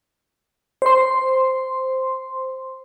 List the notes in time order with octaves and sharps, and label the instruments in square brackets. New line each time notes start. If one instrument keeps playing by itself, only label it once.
[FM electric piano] C5 C6